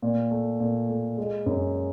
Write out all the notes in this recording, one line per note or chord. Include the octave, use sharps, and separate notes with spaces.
A#2
A3
A#2
A3
G#3
F#2